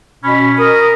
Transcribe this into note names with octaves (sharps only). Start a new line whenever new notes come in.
B2 C#4 B5
A#4 D#6